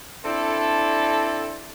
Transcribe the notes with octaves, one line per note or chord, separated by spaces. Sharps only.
C4 D4 E4 A4